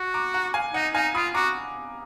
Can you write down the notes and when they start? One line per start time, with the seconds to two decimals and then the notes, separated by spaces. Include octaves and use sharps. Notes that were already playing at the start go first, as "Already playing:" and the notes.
Already playing: F#4
0.14 A#5 D6
0.34 F#5 A#5
0.54 F5 G#5
0.74 D#4 D#5 F#5
0.94 D#4 F5 G#5
1.15 F4 B5 D#6
1.35 F#4 A#5 D6